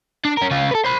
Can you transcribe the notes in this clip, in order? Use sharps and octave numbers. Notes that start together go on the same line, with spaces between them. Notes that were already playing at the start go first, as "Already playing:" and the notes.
D4
C#4 A#4
C#3 F4
A4 B4
C5 B5